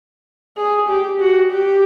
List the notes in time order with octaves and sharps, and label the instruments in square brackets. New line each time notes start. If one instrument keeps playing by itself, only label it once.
[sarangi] G#4
G4
F#4
G4